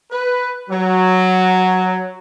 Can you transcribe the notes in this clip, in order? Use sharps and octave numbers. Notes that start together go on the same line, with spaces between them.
B4
F#3